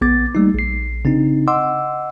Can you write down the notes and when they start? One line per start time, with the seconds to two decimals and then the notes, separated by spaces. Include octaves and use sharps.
0.01 A#1 B3 D6 A6
0.35 G3 A3 A#3 D#4
0.55 A#1 C7
1.05 C#3 C4 D4 D#4
1.48 D#5 F#5 C6 D6 E6